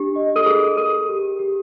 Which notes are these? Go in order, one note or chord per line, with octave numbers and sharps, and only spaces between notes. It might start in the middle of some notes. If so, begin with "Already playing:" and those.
Already playing: D4 G4
D#5
A4
G#4 A#4
A4 A#4
G4
G4